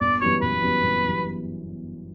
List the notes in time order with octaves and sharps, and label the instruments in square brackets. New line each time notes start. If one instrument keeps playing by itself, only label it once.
[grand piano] G1 [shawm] D5
[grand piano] F#2 E3 G3 B3 [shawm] C#5
[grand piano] G1 [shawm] B4
[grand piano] F#2 E3 G3 B3
G1
F#2 E3 G3 B3